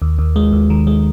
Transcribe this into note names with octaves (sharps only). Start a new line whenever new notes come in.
D#2
D#2
G#3
D#2
D#3
G#3